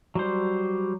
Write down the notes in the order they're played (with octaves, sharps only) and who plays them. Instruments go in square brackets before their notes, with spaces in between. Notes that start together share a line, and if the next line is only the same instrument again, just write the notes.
[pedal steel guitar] F#3 G3 C5